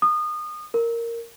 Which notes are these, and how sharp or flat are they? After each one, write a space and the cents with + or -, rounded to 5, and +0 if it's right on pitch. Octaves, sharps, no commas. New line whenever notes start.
D#6 -25
A#4 -5